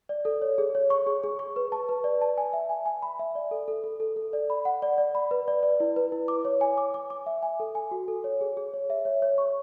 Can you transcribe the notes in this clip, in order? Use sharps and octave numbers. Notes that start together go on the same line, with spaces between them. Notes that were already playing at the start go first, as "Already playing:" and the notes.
D5
A4
C#5
G#4
C#5
C#6
G#4
G#4
C#6
B4
A5
B4
D5
A5
G#5
E5
G#5
G#5
B5
E5
D5
A4
A4
A4
A4
A4
D5
B5
F#5
D5
D5
B5
B4
D5
D5
E4
B4
E4
D6
C#5
G#5
D6
D6
D6
E5
G#5
A4
G#5
F#4
A4
C#5
G#4
G#4
C#5
E5
C#5
C#5
C#6